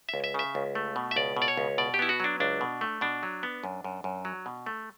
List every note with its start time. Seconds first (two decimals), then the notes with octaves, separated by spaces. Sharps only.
0.09 C#2 E5
0.24 E5
0.34 C#3 E5
0.55 C#2
0.75 A3
0.96 B2
1.11 E5
1.16 C#2 D5
1.37 B2
1.42 D5
1.48 C#5
1.57 C#2
1.78 B2 D5
1.94 G4
1.99 B3 E4
2.09 F#4
2.20 F#3 D4
2.40 C#2 D4
2.61 B2
2.81 A3
3.01 B2 D4
3.23 F#3
3.43 B3
3.64 F#2
3.84 F#2
4.04 F#2
4.25 F#3
4.46 B2
4.66 A3